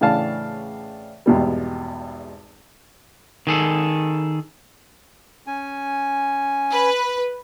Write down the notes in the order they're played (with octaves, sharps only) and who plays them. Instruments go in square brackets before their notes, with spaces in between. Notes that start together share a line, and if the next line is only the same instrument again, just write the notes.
[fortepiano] A2 C#3 E3 D4 F5 A5
G#1 E2 B2 G3
[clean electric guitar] D#3 G#4 A4
[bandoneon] C#4 G#5
[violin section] B4